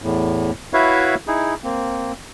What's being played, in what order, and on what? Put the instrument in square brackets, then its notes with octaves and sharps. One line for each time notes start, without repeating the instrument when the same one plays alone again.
[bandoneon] E2 A2
E4 F#4 B4 C#5 E5 F5
D#4 E4 G#4
A#3 C4